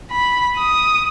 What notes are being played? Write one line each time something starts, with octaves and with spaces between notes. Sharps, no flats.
B5
D#6